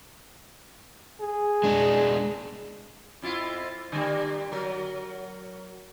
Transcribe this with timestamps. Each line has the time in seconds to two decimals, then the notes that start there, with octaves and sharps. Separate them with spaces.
1.20 G#4
1.64 G#3 D4
3.22 F2 E4 F4
3.92 D3 G3 A#3
4.52 F#3 A#4